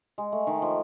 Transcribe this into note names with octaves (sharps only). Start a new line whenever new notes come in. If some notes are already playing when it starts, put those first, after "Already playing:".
G#3
A3
D#3
F3